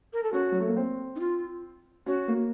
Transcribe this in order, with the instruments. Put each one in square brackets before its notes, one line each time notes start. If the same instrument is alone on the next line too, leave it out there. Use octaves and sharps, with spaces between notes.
[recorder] A#4
A4
[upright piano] C#4 [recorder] F#4
[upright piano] F#3
A3
A#3
C4
[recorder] D#4
F4
[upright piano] C#4 [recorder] F#4
[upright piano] A#3